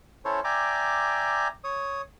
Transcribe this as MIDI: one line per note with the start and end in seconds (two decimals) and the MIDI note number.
0.25 0.40 61
0.25 0.40 64
0.25 0.40 69
0.25 0.40 72
0.25 0.40 73
0.44 1.48 74
0.44 1.48 76
0.44 1.48 79
0.44 1.48 80
0.44 1.48 82
0.44 1.48 86
1.64 2.02 73
1.64 2.02 87